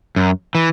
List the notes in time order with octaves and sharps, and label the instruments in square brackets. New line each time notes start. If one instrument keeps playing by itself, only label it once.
[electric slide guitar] F#2
E3